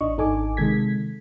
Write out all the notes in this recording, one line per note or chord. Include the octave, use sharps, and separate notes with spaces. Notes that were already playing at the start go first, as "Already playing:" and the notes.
A1 D4 D#5 C#6
G#1 D#4 A4 G#5 D6
C3 D#3 G#3 A4 G#6 B6